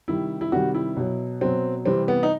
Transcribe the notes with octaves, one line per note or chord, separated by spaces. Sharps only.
C3 D#3 G3 E4
E4
C3 D#3 G3 F#4
E4
B2 F#3
B2 F#3 C4
C3 E3 G3 C4
B3
D#4